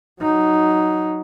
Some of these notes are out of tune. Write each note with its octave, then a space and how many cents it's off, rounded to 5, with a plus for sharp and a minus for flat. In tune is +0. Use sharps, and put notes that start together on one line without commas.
F#3 +0 D#4 +0